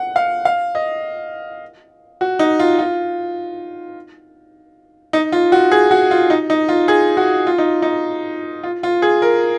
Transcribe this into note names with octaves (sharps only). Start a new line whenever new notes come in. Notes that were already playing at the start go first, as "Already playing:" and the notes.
Already playing: F#5
F5
F5
D#5
F#4
D#4
F4
F4
D#4
F4
F#4
G#4
F#4
F4
D#4
D#4
F4
G#4
F#4
F4
D#4
D#4
F4
F4
G#4
A#4